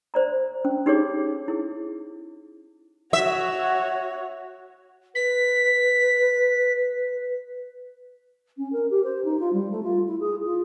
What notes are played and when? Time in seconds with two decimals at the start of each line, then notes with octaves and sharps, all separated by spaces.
0.14 C5 D5 A#5
0.65 C#4
0.86 D#4 G4 G#4 C#5 D6
1.48 E4 G#4
3.13 F#4 C#5 E5
5.15 B4 B6
8.57 C#4
8.72 A#4
8.90 G4
9.03 C5
9.24 D#4
9.39 F4
9.53 G3
9.70 A3
9.82 F4
10.07 E4
10.20 G#4
10.45 F4